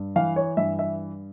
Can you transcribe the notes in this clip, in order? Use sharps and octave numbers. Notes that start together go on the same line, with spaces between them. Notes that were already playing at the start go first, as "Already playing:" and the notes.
Already playing: G2
E3 F5
C#5
G2 E5
E5